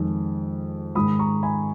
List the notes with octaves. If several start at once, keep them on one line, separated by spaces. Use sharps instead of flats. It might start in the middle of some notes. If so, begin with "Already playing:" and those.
Already playing: F2 D#3 G#3
G#2 D#3 G#3 B5 D#6
A#5 C#6
G#5 B5